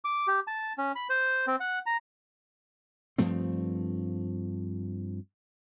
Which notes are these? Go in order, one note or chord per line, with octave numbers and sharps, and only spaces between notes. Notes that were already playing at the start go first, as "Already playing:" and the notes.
D6
G4
A5
C#4
B5
C5
C4
F#5
A#5
G2 F3 A3 C4